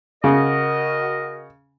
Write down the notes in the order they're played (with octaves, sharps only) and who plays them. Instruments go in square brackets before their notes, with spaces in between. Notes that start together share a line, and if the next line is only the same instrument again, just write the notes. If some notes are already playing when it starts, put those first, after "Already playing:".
[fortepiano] C#3 [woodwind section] F#4 A#4 D#5